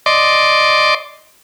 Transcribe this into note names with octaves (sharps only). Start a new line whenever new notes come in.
D5 D#5 C6 D6